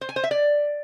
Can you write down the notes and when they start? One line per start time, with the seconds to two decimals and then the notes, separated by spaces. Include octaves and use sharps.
0.01 C5
0.09 G#5
0.16 C5
0.24 E5
0.31 D5